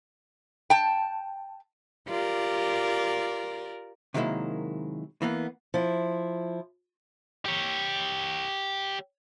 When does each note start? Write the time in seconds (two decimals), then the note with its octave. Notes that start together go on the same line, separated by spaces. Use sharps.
0.70 G5 A5
2.07 F4 G4 A#4 D5
4.14 C3 D#3 F#3 G#3 A#3 E4
5.22 E3 A#3 B3
5.74 F3 E4
7.45 G4 C#5